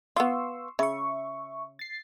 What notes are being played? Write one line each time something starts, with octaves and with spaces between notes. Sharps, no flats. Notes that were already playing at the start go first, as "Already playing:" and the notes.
B3 F4 C6 C#6 E6
C#3 E5 C#6
A6 C7